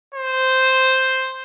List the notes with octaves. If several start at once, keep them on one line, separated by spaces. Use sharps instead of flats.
C5